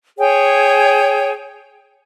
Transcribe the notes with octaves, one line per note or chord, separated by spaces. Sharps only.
G#4 C#5 G5